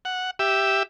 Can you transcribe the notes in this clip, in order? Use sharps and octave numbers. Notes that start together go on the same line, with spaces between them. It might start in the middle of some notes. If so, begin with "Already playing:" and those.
F#5
G4 E5